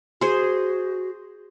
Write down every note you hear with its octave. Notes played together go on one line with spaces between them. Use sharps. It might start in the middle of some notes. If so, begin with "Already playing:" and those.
F#4 G#4 C5